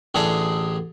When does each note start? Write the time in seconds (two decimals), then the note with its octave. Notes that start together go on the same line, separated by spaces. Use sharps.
0.15 A1 D3 G#4 A4 A5